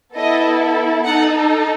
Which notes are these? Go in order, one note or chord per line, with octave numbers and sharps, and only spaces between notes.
B3 E4 A4 D#5
D#4 A4 F#5